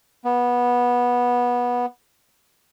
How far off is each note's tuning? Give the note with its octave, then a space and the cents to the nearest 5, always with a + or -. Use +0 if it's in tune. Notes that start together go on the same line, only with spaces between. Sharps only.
B3 -15